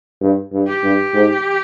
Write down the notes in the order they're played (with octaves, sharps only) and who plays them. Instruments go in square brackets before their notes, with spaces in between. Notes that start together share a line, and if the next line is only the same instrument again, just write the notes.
[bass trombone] G2
G2
[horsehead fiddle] G4
[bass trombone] G2
G#2